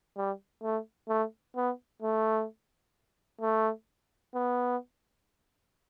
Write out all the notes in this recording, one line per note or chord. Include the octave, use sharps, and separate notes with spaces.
G3
A3
A3
B3
A3
A3
B3